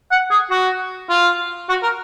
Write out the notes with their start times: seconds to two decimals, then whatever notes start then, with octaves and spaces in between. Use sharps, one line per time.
0.11 F#5
0.31 G#4
0.51 F#4
1.09 F4
1.69 F#4
1.83 A#4